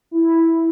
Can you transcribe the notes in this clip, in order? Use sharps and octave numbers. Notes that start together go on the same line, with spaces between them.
E4